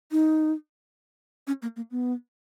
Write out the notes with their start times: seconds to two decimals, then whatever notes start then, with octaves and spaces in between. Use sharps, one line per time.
0.12 D#4
1.47 C#4
1.62 A#3
1.76 A#3
1.91 B3